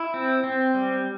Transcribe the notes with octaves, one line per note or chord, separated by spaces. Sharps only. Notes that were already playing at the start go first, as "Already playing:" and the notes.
Already playing: E4
C4
C4
G3